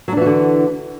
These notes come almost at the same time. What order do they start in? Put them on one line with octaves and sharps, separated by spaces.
F#3 D4 E3 F#4 D3